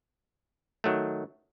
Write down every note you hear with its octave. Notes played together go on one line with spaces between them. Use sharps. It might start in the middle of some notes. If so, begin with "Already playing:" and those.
D#3 F#3 A3